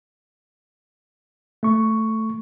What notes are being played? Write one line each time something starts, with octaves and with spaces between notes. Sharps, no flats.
A3 C#6